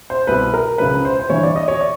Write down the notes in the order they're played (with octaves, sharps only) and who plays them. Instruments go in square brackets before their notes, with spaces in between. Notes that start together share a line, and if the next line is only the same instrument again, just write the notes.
[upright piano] C5
C2 B2 B4
A#4
C#2 C#3 F3 B4
C5
C5
G2 E3 C#5
D5
D#5
C#5
D5